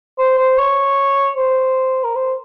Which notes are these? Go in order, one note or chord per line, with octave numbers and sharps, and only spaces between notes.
C5
C5
C#5
C5
A#4
C5